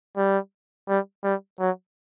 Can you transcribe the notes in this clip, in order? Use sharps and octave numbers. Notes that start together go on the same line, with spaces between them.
G3
G3
G3
F#3